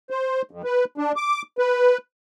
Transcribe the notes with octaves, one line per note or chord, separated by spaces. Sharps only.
C5
F2
B4
D4
D6
B4